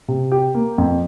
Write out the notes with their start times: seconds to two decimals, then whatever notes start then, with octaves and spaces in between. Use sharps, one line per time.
0.08 C3
0.32 G4
0.55 A#3
0.78 F2